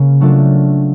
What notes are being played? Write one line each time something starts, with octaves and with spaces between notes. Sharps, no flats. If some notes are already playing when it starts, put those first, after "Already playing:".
Already playing: C#3 A#3 C#4
F#3 A3 D4 F4 A4